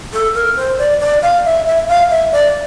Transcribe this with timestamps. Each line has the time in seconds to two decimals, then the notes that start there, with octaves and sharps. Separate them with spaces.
0.13 A4
0.34 A#4
0.56 C5
0.79 D5
1.00 D5
1.22 F5
1.45 E5
1.67 E5
1.88 F5
2.11 E5
2.32 D5